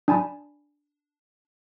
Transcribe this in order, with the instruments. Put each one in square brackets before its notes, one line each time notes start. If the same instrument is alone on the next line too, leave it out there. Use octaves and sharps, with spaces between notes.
[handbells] D4 G#5 A5 B5